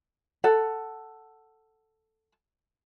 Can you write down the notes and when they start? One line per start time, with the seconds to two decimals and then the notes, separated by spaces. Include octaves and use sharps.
0.44 A4 F#5